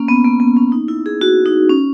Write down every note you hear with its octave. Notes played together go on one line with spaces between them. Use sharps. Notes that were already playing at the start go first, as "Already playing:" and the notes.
Already playing: A#3 C#4
B3
A#3
B3
C#4
D#4
E4
G#4
F#4
D#4
C#4